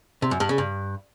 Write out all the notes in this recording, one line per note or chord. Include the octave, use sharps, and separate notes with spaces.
C3
F#2
G2
C#3
G2